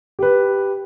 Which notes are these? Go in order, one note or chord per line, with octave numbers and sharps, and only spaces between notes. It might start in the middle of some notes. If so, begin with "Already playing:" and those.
G4 B4